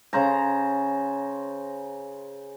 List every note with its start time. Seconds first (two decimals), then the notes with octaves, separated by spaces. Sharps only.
0.13 C#3 C5 A#5